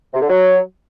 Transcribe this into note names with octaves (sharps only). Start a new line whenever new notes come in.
C3
D3
F#3